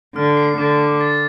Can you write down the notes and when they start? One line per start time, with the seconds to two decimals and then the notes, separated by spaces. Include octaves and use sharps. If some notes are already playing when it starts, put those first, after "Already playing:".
0.15 D3 F6
0.37 C7
0.58 D3 D6
0.79 D6
1.01 A6